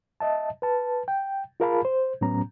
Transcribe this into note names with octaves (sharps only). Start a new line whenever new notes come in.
D#5 E5 A5
B4 A5
G5
F4 G#4 A#4 F5 A5 B5
C5
A2 F#3 B3 C#4 A#5